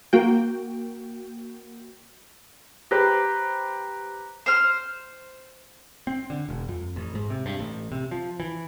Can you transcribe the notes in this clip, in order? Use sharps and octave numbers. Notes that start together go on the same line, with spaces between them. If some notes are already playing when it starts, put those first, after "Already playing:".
A#3 F#4 G5
G4 B4 C5 A#5 F#6 A#6
C5 F6
C4
D3
E1
F2
A1
G#2
C3
G2
A1
C3
F3
E3